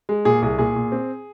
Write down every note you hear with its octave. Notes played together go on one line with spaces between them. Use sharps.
G#3
A#2 G#4
C2 G#4
A#2 G#4
A#2
C4